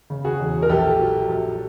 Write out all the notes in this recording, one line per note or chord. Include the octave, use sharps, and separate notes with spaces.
C#3
F#4 G#4
E1
A#4
A#1 G4 A4
F#3
A#1